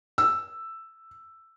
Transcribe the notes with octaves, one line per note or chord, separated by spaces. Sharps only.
E6